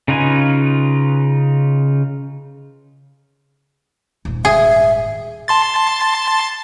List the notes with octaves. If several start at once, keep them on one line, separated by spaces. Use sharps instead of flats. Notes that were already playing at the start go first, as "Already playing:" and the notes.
C#3 D#4 F4 B4 G#5
D#1 G#2
G#4 E5
A5 C6 A6